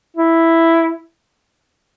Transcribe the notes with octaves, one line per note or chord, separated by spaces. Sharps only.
E4